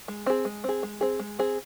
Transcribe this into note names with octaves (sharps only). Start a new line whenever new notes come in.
G#3
C4 G#4
G#3
C4 G#4
G#3
C4 G#4
G#3
C4 G#4